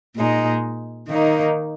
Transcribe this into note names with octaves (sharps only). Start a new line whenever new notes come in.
A#2 G#3 D#4
D#3 A#3 D#4